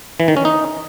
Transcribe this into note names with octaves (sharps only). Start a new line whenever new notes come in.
E3
D#3
C#4
D#4